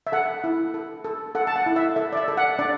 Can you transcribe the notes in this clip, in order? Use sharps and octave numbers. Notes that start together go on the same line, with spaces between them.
E5
A4 F#5
E4
A4
A4
A4 F#5
A5
F#5
E4
E5
A4 E5
D5
E5
A4
F#5
D4 D5